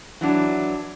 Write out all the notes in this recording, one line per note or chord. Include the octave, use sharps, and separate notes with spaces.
E3 F#3 D4